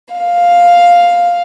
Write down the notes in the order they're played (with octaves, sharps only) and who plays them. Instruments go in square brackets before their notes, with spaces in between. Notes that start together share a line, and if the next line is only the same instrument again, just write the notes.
[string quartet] F5